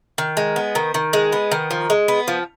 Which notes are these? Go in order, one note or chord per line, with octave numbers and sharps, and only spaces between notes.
D#3
G#3
B3
D#3
D#3
G#3
B3
D#3
F3
G#3
B3
F3